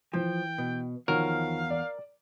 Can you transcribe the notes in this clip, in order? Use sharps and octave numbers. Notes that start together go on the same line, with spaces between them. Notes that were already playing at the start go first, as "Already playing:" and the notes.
E3 F3 G5
B2
E2 D#3 F3 F#4 A#4 C#5 F5
D5